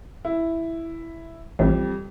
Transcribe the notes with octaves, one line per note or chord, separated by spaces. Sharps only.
E4
A1 F2 G3